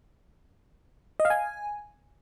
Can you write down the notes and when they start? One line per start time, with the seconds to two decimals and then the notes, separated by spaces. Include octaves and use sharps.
1.20 D#5
1.25 F5
1.30 G#5